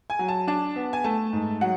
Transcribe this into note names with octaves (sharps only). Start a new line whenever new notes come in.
G#5
F#3
A5
D4 A5
B3
G#5
A3 A5
G#2
F#3 F#5